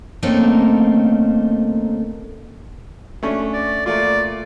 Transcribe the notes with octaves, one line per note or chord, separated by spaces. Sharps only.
D2 A3 A#3 C4 C#4 D#4
A3 C#4 D4
D5
A#2 A3 F4 D5